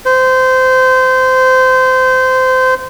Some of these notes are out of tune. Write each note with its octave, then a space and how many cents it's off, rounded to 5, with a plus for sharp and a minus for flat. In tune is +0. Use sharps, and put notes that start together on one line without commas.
C5 -25